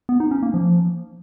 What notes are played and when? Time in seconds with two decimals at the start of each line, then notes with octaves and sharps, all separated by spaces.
0.09 B3
0.20 D#4
0.31 C#4
0.43 A#3
0.54 F3